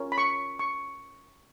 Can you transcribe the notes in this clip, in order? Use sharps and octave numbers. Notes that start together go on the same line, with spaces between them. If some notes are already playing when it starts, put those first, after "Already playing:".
Already playing: C#4 F4 A#4 C#5
B5
C#6
C#6